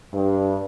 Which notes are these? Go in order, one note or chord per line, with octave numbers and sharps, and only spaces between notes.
G2